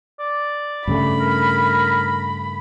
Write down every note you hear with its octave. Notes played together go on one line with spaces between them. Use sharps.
D5
G2 C#3 A3 B5
A#4